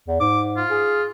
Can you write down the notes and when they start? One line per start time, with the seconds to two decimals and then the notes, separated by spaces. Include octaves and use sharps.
0.08 E2
0.20 G#2 D6
0.57 F4
0.70 G#4